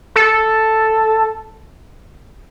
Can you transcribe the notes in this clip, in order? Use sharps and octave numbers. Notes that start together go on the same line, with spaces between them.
A4